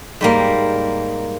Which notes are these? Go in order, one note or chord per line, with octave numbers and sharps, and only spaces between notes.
G#2 G3 A#3